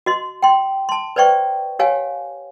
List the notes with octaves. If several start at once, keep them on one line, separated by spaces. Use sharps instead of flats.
F#4 D#5 C6
G5 C6
A5 C6
B4 C5 D5 G5 C#6
G4 C#5 F5 G#5